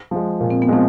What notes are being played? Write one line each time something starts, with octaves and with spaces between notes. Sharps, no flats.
F3 G#3
A#2
C4
B3
F3 G#3 C4